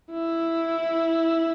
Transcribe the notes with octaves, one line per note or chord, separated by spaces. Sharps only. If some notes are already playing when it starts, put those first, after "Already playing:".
E4